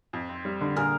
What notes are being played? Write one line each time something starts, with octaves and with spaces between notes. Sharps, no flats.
F2
C4
G3
D3
A#2 G#4 A#4